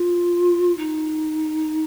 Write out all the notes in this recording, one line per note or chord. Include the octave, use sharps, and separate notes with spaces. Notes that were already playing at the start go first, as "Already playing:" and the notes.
Already playing: F4
D#4